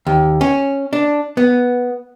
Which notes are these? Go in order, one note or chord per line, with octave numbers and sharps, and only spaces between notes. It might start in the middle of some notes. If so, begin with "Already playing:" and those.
D#2
C#4
D4
B3